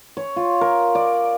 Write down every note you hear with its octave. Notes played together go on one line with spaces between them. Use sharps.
C#5
F4
A#4
D5